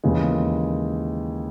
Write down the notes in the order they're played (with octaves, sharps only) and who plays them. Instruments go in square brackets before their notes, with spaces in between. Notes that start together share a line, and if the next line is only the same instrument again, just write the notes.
[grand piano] D#2 C#3 E3 G#3